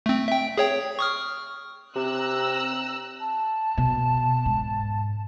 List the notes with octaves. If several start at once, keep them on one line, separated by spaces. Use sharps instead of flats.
A3 C4
E5 G5
G#4 C#5 G5
C#6 D#6 F6
C3 C4 A#5 E6 F#6
A5
B2
G#2